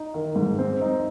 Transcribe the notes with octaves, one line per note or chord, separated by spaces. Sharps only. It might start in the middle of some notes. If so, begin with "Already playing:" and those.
Already playing: D#4
D#3
G#2
C4
D#4